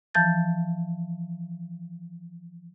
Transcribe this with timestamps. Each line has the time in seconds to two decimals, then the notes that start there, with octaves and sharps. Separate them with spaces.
0.14 E3 F3 A5 G6 A6